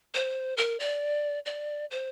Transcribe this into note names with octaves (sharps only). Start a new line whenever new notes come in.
C5
A#4
D5
D5
C5